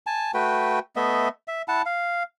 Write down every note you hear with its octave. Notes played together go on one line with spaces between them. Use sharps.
G#5 A5
A3 F#4 B4 G5
A3 B3 D#5 E5
E5
E4 F#5 A5
F5